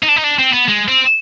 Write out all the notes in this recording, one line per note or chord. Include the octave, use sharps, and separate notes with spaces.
D#4
D4
D#4
D4
C4
B3
G#3
C4